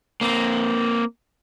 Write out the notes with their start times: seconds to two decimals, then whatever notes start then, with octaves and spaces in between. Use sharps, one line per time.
0.21 A#3 C4